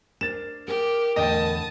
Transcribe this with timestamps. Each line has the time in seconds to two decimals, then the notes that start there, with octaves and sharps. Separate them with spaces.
0.21 D4 A#4 C5 A6 E7
0.68 G4 G#4 A#4
1.16 E2 A2 D3 D#5 G5 A5 D#6